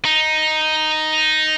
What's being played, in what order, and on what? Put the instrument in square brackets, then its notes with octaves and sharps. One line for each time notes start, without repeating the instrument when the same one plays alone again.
[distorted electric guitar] D#4